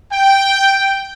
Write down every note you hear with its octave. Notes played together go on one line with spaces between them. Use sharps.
G5